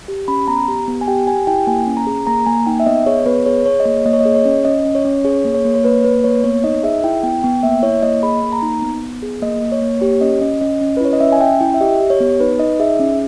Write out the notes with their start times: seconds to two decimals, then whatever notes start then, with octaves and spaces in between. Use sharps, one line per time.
0.08 G4
0.28 C#4 B5
0.48 B3 A#5
0.68 G4
0.88 B3
1.01 G#5
1.08 G4 G5
1.27 G4 G#5
1.47 E4 G5
1.67 A#3 G#5
1.87 C#4
1.97 A#5
2.07 G#4
2.27 A#3 A#5
2.46 A#3 G#5
2.67 D#4 G5
2.80 E5
2.86 B3 D#5
3.06 G#4 C#5
3.26 B3 B4
3.46 G#4 C#5
3.66 G#4 C#5
3.80 D#5
3.85 A#3 C#5
4.06 A#3 D#5
4.13 C#5
4.21 D#5
4.25 G#4
4.35 C#5
4.45 C#4
4.65 C#4 D#5
4.85 C#4
4.95 C#5
5.05 C#4
5.25 G#4 C#5
5.45 A#3
5.55 C#5
5.65 A#3
5.75 C#5
5.84 A#3 B4
6.04 A#3 B4
6.24 A#3 C#5
6.44 B3 C#5
6.64 D#4 D#5
6.83 G#4 E5
7.04 E4 G5
7.23 B3 G5
7.43 B3 G5
7.63 A#3 E5
7.83 E4 C#5
8.03 A#3 D#5
8.23 G#4 B5
8.43 A#3
8.53 A#5
8.62 D#4
8.82 B3
9.02 B3
9.22 G#4
9.42 A#3 D#5
9.62 A#3
9.72 C#5
9.82 A#3
10.01 G4 C#5
10.21 C#4 D#5
10.41 C#4 D#5
10.61 C#4 D#5
10.81 C#4
10.97 B4
11.00 E4 C#5
11.13 D#5
11.20 C#4 E5
11.32 G#5
11.40 C#4 G5
11.60 E4 G5
11.74 E5
11.80 G4 D#5
12.01 G4
12.10 C#5
12.21 B3
12.40 D#4 B4
12.60 D#4 D#5
12.80 G#4 E5
13.00 C#4